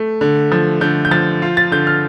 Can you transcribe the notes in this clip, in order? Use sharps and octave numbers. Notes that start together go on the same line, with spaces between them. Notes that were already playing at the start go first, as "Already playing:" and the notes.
Already playing: A3
D3
F3
D3 G6
G6
F3 A6
F4
A6
D3 G6
F6